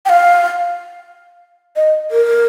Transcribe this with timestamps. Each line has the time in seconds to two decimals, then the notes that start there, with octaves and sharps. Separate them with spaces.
0.06 G5
0.09 F5
1.76 D#5
2.11 A#4